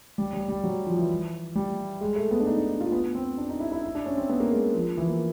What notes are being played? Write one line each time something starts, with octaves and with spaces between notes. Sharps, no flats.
G3
G3
G3
F#3
F3
E3
G3
G#3
A3
B3
D4
D#4
D4
D#4
F4
B3
C4
D4
D#4
E4
E4
E4
D4
C#4
C4
B3
A#3
G#3
F3
E3
A#3